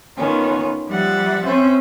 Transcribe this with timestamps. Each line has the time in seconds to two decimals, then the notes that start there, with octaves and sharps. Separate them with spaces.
0.18 D#3 B3 C#4 F4
0.89 F3 G3 E5 F#5 A6
1.45 C4 C#4 C5 E5